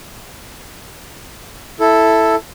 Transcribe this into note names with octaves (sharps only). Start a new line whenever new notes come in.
E4 A4